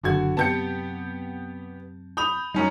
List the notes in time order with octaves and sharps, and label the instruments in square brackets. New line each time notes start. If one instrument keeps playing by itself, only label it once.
[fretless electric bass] F#1 F#2 [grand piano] D3 F#4 G#6
[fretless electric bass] F#2 C3 [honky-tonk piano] B3 G4 [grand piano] A5 G6 C#7
[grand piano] B5 D#6 F7 [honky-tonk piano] G6
[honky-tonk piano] F#2 C#4 D#4 [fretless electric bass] G3